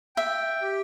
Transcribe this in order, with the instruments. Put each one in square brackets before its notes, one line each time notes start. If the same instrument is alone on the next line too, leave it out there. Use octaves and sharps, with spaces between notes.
[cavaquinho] E5 [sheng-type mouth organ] G5
[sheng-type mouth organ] G4